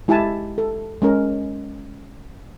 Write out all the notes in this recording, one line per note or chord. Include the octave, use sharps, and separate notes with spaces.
G#3 E4 G4 E5 G#5 A5
A4
G#3 C#4 A#4